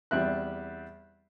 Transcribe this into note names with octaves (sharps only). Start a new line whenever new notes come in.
E2 G3 C4 E5 F#6